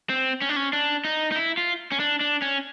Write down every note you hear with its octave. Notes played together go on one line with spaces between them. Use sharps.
C4
C#4
D4
C#4
D4
D#4
D#4
E4
F4
C#4
D4
D4
C#4